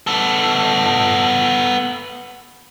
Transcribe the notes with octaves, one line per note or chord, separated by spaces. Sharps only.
B3 A4